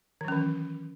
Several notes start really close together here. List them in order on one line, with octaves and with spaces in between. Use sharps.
D#3 F#3 C#4 E3